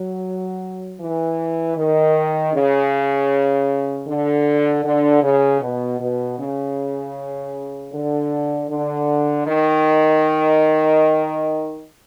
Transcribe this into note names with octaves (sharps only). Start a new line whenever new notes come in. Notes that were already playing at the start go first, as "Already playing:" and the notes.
Already playing: F#3
E3
D#3
C#3
D3
D3
C#3
B2
B2
C#3
D3
D3
D#3